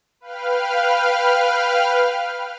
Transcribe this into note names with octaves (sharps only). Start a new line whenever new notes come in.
B4 F5 G5 F6